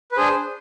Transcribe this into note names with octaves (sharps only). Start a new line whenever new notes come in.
B4
D4 G#4 C5